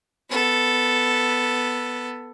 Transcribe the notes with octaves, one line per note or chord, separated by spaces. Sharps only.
B3 A4